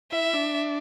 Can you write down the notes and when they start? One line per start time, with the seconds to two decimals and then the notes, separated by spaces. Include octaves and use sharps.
0.12 E4 E5
0.33 D4